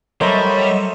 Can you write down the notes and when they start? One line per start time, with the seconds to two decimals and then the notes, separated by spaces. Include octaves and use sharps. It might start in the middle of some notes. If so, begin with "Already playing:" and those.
0.21 F#3 G3 A3 A#4 C5 C#5 D#5 E5